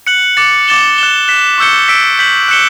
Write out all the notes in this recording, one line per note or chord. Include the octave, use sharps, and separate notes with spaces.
F#6 C#7 F#7
D6 A6 C#7
D6 A6 E7 G7
F#6 A6 E7 G7
F#6 B6 E7
C#6 E6 G6 C#7 G7
E6 B6 D7
G6 B6 F#7
F#6 C#7 E7 G7